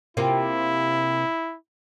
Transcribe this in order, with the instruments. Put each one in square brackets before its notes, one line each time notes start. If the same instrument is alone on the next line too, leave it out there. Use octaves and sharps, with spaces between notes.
[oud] C3 A#3 F4 [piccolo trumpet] E4